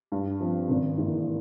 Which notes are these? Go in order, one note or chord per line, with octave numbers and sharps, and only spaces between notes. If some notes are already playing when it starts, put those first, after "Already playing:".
G2
F3 C4
G#1
G#2 E3 A#3